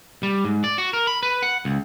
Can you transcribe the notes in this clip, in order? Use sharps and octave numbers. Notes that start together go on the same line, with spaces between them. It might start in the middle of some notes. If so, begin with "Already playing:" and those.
G3
G#2
D5
F#4
A#4
B5
B4
F#5
C#2